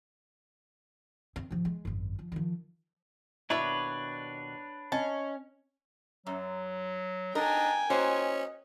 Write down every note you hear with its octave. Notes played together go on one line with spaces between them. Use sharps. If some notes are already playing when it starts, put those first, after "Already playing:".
C4
A1 F3
G#3
G#1 F#2
F3
D#3 F3
D#2 B2 D4 E4 B4 C#5 D5 E5
C#4 D#5 A5
F#2 F#3
D4 D#4 A#4 G5 G#5
A#3 C#4 F#4 C5 D#5